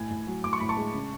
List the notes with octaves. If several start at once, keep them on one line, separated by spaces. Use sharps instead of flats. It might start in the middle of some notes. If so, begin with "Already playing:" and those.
Already playing: A2 G#5
A2
F#3
A2 D6
C#6
A2 B5
A5 C#6
G#3
C#3